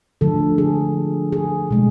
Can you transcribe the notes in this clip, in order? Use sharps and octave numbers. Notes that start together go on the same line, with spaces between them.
D3 F3 A3 A4
G#4
G#4
B2 G#3